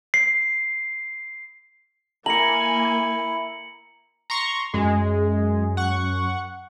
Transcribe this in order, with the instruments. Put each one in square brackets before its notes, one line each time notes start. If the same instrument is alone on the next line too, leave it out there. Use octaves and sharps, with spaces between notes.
[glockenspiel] C7
[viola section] A#3 G#5 [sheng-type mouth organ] E4 [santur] A#5 [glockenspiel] C#7 F#7
[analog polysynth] A#5 C6 C#6
[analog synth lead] F#2 [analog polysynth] G#3
[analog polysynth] F#5 C#6